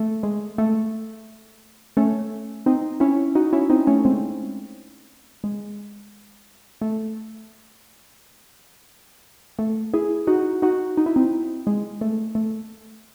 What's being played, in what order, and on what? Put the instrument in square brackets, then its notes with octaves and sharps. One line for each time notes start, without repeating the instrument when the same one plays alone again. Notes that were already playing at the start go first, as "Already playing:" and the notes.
Already playing: [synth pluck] A3
G#3
A3
A3 C#4
C4 D#4
C#4 E4
D#4 F#4
C#4 E4
C4 D#4
A3 C#4
G#3 C4
G#3
A3
A3
E4 G#4
D#4 F#4
D#4 F#4
D#4
E4
C4 D#4
G#3
A3
A3